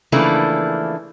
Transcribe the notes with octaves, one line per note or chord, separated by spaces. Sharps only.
C#3 E3 F3 A3 A#3 D4